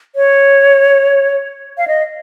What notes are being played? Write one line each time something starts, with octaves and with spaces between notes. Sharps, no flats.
C#5
F5
D#5